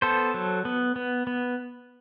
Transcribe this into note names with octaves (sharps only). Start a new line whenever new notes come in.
B3 A4 C5
F#3
B3
B3
B3